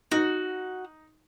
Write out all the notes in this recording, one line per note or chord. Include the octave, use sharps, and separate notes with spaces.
D#4 F#4